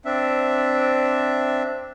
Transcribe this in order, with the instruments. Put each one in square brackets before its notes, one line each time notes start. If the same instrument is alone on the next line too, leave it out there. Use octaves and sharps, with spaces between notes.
[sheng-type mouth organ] C4 D4 E5